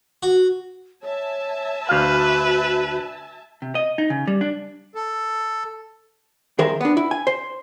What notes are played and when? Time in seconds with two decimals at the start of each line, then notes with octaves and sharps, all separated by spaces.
0.23 F#4
1.03 C#5 E5 G#5 A5
1.89 D2 F#4 B4 F5
3.62 C3
3.75 D#5
3.98 D#4
4.10 C#3
4.27 G3
4.41 D4
4.95 A4
6.59 C2 D#3 G#4 A#4 C5 E5
6.81 B3 D4
6.97 E4
7.11 G#5
7.27 C5